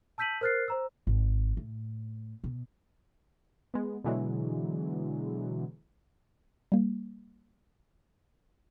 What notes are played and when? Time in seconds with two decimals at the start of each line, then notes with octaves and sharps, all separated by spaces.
0.18 A5 E6 G6 B6 D#7 F#7
0.41 A#4 C5 F6 F#6 A6 C7
0.68 C5 A#5 E6
1.07 G#1
1.57 A2
2.44 B2
3.74 G#3 B3
4.04 B2 D3 E3 F#3 G#3
6.72 G3 A#3